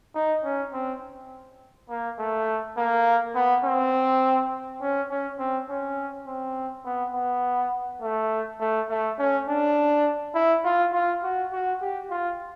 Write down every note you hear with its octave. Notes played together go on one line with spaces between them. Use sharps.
D#4
C#4
C4
A#3
A3
A#3
B3
C4
C#4
C#4
C4
C#4
C4
B3
B3
A3
A3
A3
C#4
D4
E4
F4
F4
F#4
F#4
G4
F4